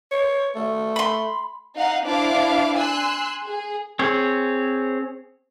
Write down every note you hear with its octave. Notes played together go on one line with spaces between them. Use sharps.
C#5
A3
B5 C6
D#4 F5 F#5
D4 E4 C5 F5 D6
G#5 C6 E6 F#6
G#4
C4 G#4 C#5